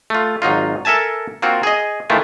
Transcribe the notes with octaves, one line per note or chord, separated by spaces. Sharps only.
A3 F4
G#1 F#3 D#4 F4
A4 A#4 E5 G#5 A5
A#3 C4 F4 F#4
G#4 D#5
D#3 E3 A3 E4 F4